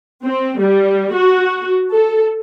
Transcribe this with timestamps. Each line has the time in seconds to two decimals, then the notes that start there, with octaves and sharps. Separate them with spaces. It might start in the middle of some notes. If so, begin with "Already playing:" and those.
0.23 C4
0.59 G3
1.14 F#4
1.92 A4